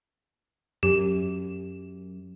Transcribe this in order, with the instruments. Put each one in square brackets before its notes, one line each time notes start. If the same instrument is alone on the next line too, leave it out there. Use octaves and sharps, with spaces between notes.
[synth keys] F#2 [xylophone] G4